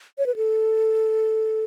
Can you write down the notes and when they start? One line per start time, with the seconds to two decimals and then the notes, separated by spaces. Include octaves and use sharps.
0.18 C#5
0.26 B4
0.36 A4